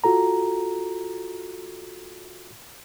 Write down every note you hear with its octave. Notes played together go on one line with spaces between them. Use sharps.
F4 F#4 A4 A#5